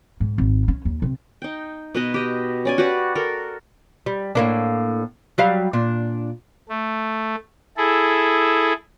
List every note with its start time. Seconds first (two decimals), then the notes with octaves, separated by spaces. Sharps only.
0.20 G#2
0.38 G#1
0.68 C#4
0.85 D#2
1.02 C3
1.42 D#4 G5
1.95 B2 B4 D#5
2.14 G4 D#5
2.65 C#4 D5 G#5
2.78 F#4 G4 B4 D5
3.15 F#4 A4 A#4
4.06 G3
4.35 A2 A#3 D4
5.38 F#3 G3 F5
5.73 A#2 D4
6.69 A3
7.77 E4 G#4 A4